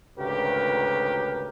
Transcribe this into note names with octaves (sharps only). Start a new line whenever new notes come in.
G#1 D2 C#3 G4 A#4 B4